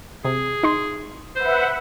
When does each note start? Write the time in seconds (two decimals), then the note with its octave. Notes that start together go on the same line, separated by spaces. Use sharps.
0.25 C3 G#4
0.63 D#4 C6
1.35 B4 C5 E5 F#5